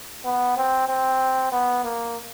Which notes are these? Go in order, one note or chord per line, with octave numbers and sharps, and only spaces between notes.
B3
C4
C4
B3
A#3